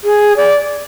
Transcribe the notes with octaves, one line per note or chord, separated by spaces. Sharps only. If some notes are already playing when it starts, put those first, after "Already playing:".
G#4
D5